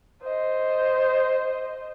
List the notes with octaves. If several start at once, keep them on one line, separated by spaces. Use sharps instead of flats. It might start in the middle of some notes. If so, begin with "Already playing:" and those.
C5 D#5